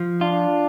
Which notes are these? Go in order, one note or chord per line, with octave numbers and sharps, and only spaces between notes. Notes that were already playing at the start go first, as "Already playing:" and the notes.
Already playing: F3
D4 F4